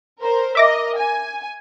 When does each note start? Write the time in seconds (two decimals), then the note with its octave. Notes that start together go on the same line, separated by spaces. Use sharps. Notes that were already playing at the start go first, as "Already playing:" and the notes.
0.20 A#4 C5
0.55 A#4 D#5 E5 D6 A#6
0.97 G#5